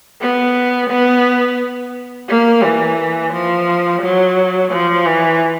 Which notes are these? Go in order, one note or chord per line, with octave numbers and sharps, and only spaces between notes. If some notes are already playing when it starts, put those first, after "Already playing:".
B3
B3
A#3
E3
F3
F#3
F3
E3